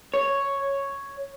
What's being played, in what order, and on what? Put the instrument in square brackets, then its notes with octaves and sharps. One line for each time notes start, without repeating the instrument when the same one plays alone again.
[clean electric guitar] C#5